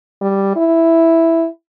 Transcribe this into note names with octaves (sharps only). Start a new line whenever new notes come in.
G3
E4